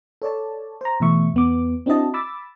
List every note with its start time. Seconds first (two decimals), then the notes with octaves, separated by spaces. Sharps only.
0.22 A4 C#5 D5 A5
0.81 C5 A#5
1.00 B2 E3 A3 E5 C#6
1.34 E2 B3 D6
1.86 C4 D4 E4 F#4 D#5 A5
2.14 B5 D6 E6 A6